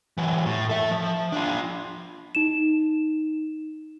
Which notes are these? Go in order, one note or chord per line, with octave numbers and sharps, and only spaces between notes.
E3 F#3
A2
A4 E5
F3
D4 F4
D#4 E7